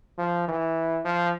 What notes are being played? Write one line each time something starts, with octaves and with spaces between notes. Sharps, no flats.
F3
E3
F3